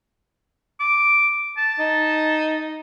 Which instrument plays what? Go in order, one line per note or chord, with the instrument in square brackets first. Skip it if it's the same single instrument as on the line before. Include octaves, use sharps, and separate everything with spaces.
[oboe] D6
A5
[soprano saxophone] D#4